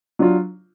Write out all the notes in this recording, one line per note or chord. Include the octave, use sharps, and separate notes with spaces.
F#3 D4 F4